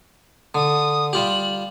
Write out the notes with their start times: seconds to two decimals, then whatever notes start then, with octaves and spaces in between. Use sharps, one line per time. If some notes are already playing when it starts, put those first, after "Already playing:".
0.55 D3 D#6
1.13 G3 F4 G4 F#7